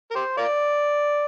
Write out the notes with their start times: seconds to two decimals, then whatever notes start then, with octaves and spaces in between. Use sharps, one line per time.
0.11 A#4
0.15 G4 C5
0.38 F4 A#4 D5